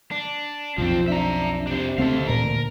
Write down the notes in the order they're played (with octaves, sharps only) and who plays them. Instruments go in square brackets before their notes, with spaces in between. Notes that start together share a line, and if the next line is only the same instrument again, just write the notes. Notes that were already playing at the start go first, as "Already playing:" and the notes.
[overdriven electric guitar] D4
[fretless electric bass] B1 F2 [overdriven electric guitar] F3 C4 [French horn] F4
[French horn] D4 [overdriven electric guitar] E5 A#5
[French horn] C3 [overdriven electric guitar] D4 C5
[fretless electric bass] D2 C4 [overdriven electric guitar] A4 F5
[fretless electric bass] A1 D2 A#2 [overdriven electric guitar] A#4